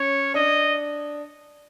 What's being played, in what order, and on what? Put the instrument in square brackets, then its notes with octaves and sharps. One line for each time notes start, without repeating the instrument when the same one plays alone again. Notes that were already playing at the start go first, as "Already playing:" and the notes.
Already playing: [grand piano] C#4 [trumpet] C#5
[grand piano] D4 [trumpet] D#5